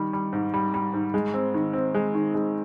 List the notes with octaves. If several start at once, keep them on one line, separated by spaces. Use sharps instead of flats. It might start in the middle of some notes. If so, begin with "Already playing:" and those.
Already playing: D#3 G3
G3
G#2
G3
G3
G#2
G#3
C4
D#3
C4
G#3
D#3
G#3